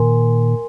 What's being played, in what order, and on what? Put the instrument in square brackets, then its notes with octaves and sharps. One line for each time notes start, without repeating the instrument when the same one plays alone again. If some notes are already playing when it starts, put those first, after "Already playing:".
Already playing: [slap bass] A#2 D#3 [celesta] A#4 G#5 C6